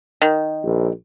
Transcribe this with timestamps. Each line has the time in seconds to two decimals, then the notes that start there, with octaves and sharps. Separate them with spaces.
0.22 D#3
0.64 A#1